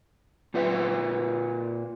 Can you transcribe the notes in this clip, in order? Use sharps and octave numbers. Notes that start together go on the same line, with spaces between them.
A#2 F4 B4 E5